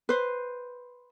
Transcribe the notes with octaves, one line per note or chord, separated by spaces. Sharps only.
B4 C5